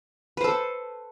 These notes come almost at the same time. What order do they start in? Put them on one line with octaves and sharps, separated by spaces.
B4 C5 A4